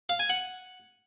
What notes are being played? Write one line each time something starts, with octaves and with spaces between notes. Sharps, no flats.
F5
G#5
F#5